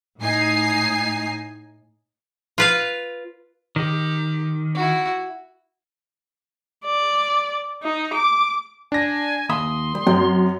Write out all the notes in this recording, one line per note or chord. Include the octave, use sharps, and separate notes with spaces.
A2 D#4 G#5 C7
F4 B4 F5
D#3 G4
E4 F#4
D5
D#4
D6
D4 G#5 A#6
D#2 E5 B5 C6 D#6
G3
F#2 C4